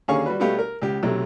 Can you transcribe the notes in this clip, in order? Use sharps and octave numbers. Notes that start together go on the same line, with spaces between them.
D#2 D3 C#4 G#4 F5 C#6
G3 F#4 B4
B2 G3 A3 B3 G4 F5
A#4
C#2 G4
B1 C3 F#3 A3